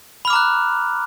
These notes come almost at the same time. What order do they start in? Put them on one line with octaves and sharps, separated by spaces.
B5 F6 D6 A#5 F#6